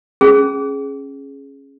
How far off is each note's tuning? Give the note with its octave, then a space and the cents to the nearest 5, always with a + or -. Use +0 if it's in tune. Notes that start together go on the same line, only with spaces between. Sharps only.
C#4 -15 G#4 +5